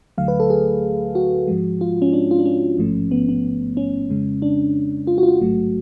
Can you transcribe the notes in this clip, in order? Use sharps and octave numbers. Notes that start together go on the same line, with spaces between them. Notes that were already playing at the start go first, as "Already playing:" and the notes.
D2 D3 F#3 A3 F5
B4
A4
G#4
F#4
G#2 F3 G#3
F4
C#4
D4
F4
D4
C#4
A1 G#2 F3 A3
B3
B3
C#4
F2 C#3 G#3
D4
F4
F#4
F4
F#4
A1 G#2 F#3 A3